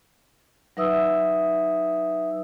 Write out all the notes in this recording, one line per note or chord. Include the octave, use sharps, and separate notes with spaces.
F#3 D#4 B4 E5 D#6 E6